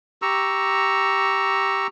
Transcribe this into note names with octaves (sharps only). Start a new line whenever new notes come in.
G4 A#5 C#6 E6